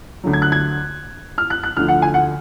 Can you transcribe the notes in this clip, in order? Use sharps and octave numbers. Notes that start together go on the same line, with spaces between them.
D2 D3 F#3
G#6
F#6
G#6
F6
F#6
F#6
D2 D3 F3 F6
F#5
G#5
F#5